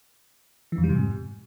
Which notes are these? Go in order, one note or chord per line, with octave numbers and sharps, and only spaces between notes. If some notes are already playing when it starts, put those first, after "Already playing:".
E3
F2
G3
C3
G#2